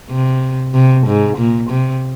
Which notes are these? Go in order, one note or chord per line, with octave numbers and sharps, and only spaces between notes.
C3
C3
G#2
A#2
C3